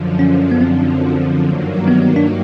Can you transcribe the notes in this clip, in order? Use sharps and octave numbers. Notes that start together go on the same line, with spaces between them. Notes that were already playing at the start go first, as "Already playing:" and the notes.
Already playing: F#2 D3 F3
C#4
B3
C4
G2 D#3 F#3 A#3
B3
B3
D4